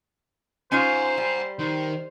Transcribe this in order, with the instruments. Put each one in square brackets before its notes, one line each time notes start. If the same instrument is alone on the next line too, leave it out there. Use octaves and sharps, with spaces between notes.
[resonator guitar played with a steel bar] C#4 D#4 F4 [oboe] C5 [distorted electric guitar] G#5 A#5
[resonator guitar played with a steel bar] G3
[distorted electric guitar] D#3 [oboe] C5